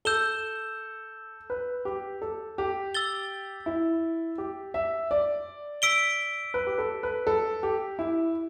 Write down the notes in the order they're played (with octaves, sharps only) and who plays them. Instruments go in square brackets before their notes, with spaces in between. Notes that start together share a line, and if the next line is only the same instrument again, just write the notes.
[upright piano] A4 [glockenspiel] E6 G6 E7 G7
[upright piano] B4
G4
A4
G4
[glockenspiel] E6 A6 G7
[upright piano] E4
G4
E5
D5
[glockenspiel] E6 B6 D7 G7
[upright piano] B4
G4
A4
B4
A4
G4
E4